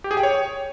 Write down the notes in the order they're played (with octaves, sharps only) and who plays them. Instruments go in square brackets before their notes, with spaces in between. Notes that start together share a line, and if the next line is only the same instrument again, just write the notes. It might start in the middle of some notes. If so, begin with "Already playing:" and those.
[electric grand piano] G4
G#4
G5
C#5